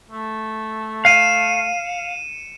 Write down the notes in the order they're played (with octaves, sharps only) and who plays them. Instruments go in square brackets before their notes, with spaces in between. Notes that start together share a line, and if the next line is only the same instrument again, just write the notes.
[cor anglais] A3
[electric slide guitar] F5 [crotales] C#7 D#7 E7